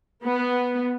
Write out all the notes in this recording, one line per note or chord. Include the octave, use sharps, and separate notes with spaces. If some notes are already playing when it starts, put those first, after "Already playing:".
B3